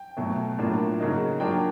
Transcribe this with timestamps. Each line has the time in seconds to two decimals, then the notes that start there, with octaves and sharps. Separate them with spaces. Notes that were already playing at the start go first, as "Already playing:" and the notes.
Already playing: G5
0.17 B2 F#3 A3
0.58 A2 F#3 A#3 D4 F4
0.99 C#3 F#3 A#3 D#4
1.40 F#3 A#3 D4 F4 G5